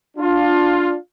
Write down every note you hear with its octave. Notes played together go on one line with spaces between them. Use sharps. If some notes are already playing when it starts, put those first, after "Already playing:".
D4 F4